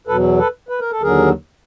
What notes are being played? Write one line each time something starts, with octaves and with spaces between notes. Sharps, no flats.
E2 B2 F#3 A4 B4
A4 B4
B4
A#4
A4
D#2 D3 F#3 G#4 A#4